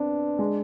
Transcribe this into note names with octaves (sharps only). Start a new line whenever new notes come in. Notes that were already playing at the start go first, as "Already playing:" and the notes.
Already playing: B3 C4 D4
G#3